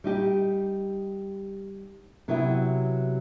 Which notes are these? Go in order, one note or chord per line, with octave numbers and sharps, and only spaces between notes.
G3 D#4 G4
C3 F#3 B3 E4